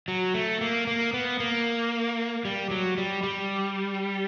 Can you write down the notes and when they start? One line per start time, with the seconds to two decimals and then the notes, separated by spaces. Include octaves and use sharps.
0.08 F#3
0.34 A3
0.61 A#3
0.87 A#3
1.14 B3
1.40 A#3
2.45 G3
2.71 F#3
2.98 G3
3.23 G3